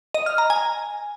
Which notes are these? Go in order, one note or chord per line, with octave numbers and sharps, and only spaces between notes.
D#5
F6
A#5
G#5